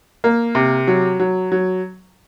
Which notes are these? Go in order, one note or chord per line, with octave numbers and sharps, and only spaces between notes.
A#3
C3
F#3
F#3
F#3